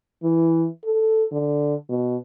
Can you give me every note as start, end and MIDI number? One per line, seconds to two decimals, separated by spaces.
0.23 0.66 52
0.85 1.24 69
1.32 1.74 50
1.89 2.16 47